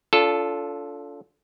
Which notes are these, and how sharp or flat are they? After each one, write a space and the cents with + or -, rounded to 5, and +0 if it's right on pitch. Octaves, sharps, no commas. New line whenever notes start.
D4 -40 F4 +0 A4 -5